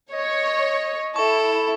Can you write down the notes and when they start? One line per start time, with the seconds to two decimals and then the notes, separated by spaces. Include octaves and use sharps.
0.13 C#5 D#5
1.16 E4 A4 C#6